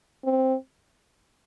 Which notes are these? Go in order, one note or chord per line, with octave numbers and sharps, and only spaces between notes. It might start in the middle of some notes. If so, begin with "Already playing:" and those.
C4